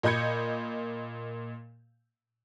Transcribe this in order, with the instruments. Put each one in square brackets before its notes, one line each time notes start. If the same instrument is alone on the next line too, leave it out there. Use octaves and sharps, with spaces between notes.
[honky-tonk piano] A#2 D#5 B5 G6 G#6 C#7